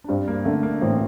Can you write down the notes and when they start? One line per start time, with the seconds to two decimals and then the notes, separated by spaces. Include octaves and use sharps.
0.04 D4
0.09 G2 C4
0.28 A#3
0.45 D3 A3
0.63 A#3
0.81 A1 C4